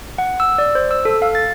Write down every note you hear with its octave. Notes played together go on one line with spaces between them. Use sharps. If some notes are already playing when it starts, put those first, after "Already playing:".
F#5
E6
D5
C5
E6
A4
F5
A6